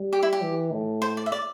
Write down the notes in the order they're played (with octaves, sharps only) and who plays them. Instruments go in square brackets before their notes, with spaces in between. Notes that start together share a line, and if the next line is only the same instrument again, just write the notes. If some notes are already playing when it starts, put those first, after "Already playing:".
Already playing: [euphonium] G3
[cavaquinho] G4
E4
G4
[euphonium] E3
A2
[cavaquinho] C5
D5
E5
D5